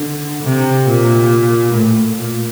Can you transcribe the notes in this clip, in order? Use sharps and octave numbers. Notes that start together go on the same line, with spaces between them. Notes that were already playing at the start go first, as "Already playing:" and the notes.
Already playing: D3
C3
A#2
A2
A#2